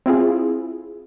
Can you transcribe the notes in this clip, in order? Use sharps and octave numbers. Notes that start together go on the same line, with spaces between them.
C4 E4 F4 G#4